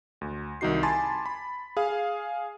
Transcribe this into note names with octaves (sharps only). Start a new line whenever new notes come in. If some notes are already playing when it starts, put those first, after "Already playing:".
D2
C2 D#3 D#4 F#4 C7
G#5 A5 B5 C6 D6 A6
B5
G#4 F5